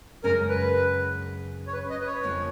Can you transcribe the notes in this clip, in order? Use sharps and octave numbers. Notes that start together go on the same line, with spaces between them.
F#2 C#3 G#3 C#4 A#4
B4
C#5
B4
D#5
B4
C#5
F2 C#3 F3 A#3 C#4